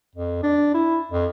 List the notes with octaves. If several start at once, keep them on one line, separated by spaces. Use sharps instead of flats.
F2
D4
E4
F2